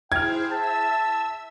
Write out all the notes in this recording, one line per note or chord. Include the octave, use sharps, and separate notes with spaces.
E4 G#4 C5 G5 F6 G#6
E5 A5 E6